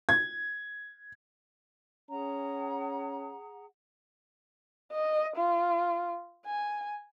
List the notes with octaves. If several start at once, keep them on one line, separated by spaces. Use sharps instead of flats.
G#6
C#4 G#4 F#5 A#5
D#5
F4
G#5